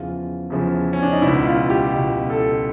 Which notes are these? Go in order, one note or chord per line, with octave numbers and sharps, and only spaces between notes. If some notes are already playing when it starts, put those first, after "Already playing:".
Already playing: E2 C#3 F3 F4
E2 C#3 F3
C#4
D4
D#4
C#2 B2 E4
F4
G4
C#2 B2
A4